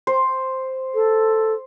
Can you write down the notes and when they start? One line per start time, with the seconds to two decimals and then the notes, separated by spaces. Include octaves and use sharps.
0.07 C5
0.94 A4